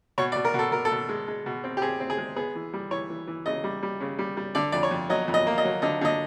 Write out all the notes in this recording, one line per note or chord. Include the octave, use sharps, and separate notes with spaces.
B2 C#5
D5
B2
A#4
B2
A4
B2 A#4
A4
B2
G#3
G#3
B2
C4
G4
C4 G#4
C4
G#4
G#3
B3 G#4
E3
G3
E3 C#5
E3
E3
C#3 D#5
G3
G3
C#3
G3
G3
D3 D5
F2 D5
C#5
F2
F#3 D#5
F2
D#5
A#3
D#5
F#3
D3 D#5
D3 D#5